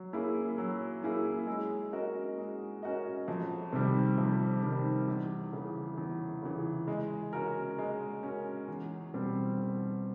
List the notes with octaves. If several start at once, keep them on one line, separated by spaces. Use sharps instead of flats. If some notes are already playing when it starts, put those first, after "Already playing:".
Already playing: F#3
A#3 C#4 E4 G#4
F#3
A#3 C#4 E4 G#4
G#3
C#4 F#4 A#4 D#5
G#3
C#4 F#4 A#4 D#5
F2
C3 D#3 G3
F2
C3 D#3 G3
E2
C#3 E3
E2
C#3 E3
G#3
C#4 F#4 A#4
G#3
C#4 F#4 A#4
E2
B2 G3 C4
E2